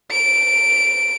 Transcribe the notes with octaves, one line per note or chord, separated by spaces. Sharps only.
D7